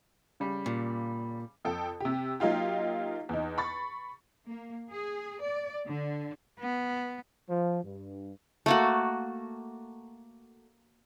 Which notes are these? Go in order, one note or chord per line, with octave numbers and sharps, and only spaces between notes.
C#3 G3
A#2
F2 A4 G5
C3 G4
F#3 A#3 D#4 F4 G4
E2 D#4
B5 C#6 A6
A#3
G#4
D5
D3
B3
F3
G2
A3 A#3 F#4